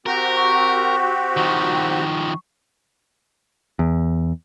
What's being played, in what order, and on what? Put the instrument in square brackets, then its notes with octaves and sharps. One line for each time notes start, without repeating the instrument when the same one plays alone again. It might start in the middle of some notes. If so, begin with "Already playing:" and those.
[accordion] C4 F#4 G4 [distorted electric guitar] A#4
[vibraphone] C#6
[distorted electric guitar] D#3 F3
[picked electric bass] E2